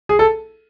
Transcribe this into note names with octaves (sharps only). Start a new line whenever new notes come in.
G#4
A4